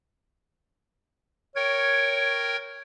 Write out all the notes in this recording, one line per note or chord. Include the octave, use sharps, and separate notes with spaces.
A#4 C#5 G5 G#6